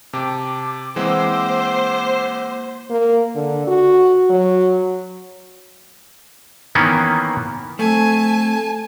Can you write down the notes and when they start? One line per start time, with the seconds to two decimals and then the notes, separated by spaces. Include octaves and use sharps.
0.13 C3 G4 A5 D6
0.96 E3 G#3 A#3 C4 C5 F#5 E6
2.90 A#3
3.35 D3
3.67 F#4
4.30 F#3
6.75 D#3 E3 A#3 B3 C#4
7.79 A3 C4 G#5 A5